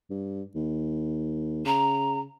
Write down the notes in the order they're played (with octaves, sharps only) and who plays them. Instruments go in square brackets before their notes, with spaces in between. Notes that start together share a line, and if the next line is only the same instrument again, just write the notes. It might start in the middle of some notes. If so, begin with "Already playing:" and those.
[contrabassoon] G2
D#2
[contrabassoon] C#3 [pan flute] A#5